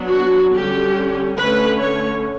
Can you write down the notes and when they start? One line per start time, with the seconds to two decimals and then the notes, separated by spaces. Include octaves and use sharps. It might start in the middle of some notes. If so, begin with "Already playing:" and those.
Already playing: F#3 B3 D4
0.10 F#4
0.53 D3 G3 C#4 G4
1.37 D3 A3 C#4 B4
1.79 C#5